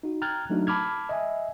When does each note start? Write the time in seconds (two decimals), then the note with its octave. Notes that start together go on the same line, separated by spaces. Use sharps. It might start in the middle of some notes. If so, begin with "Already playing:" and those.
0.03 D#4 F#4
0.22 G5 A#5 F6 F#6 G#6 A6
0.50 F#3 A3 D4 D#4 F#4
0.67 A5 B5 D6 F6 G#6
1.09 D#5 E5 G#5